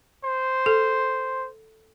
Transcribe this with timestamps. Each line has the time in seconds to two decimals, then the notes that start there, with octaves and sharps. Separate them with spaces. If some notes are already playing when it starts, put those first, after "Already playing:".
0.24 C5
0.66 A4